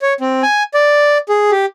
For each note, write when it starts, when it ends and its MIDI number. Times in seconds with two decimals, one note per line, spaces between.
0.02 0.13 73
0.21 0.42 60
0.43 0.63 80
0.74 1.18 74
1.29 1.51 68
1.51 1.66 67